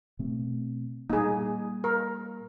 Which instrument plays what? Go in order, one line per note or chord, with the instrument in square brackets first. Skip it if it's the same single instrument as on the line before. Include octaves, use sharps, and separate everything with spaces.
[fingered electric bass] B2 A3 C4
[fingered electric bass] A#2 G3 A#3 [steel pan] D#4 G#4
[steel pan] A#4